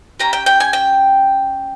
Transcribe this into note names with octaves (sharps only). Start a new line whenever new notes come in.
C#4 G4 A#5
G5
G5
G#5
G5